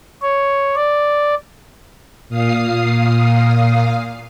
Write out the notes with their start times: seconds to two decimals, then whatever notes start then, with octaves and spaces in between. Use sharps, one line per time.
0.22 C#5
0.75 D5
2.29 A#2 F5 D#6 C7